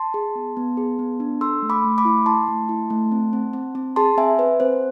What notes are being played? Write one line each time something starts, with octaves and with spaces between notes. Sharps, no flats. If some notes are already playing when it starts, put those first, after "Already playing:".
Already playing: A5 C6
G#4
B3
B3
G#4
B3
D4
A4 C6 E6
A3
B5 D6
A3
B5 D6
E4
E4 A5 C6
A3
E4
A3
C4
C4
C4
C4
G#4 A5 C6
C4 E5 G#5
C4 B4
C4 C5